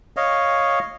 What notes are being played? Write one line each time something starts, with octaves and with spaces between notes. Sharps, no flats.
C#5 D#5 F5